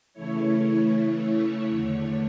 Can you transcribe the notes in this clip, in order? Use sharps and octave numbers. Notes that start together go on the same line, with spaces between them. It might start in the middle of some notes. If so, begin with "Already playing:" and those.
C#3 E3 A3 E4 C#5
C#5
E2 D3 A3